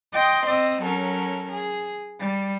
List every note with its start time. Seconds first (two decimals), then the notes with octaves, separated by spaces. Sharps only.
0.13 D#5 G5 C6 D6 D#6
0.46 C4 D#5 E6
0.83 F#3 C#4 A4 A#4
1.52 G#4
2.19 G3